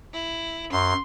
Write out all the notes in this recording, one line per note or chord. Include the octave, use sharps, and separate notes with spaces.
E4
F#2 C6